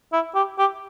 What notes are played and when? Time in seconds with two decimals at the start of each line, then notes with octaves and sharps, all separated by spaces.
0.13 E4
0.35 G4
0.58 G4